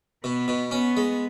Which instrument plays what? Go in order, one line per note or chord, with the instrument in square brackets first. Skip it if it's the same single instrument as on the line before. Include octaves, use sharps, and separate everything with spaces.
[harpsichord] B2 [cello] B3
[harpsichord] B2
[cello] B3 [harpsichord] C#4
[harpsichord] G#3